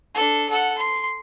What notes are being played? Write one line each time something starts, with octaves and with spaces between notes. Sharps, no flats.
D4 A4
A4 F#5
C6